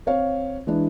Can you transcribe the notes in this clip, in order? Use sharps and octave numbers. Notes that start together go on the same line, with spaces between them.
C4 C#5 F5
E3 G#3 D4